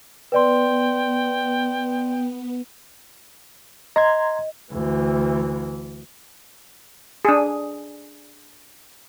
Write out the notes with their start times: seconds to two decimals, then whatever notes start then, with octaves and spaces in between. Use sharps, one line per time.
0.32 B3 B4 D5 G5 C6
3.96 D#5 A#5 C6 G#6
4.72 D2 E3
7.25 D4 G#4